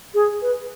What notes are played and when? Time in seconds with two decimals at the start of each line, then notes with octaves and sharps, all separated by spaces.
0.14 G#4
0.42 B4